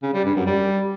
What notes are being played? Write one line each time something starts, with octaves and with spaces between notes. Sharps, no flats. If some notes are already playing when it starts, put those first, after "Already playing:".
C#3
G3
G2
F#2
G3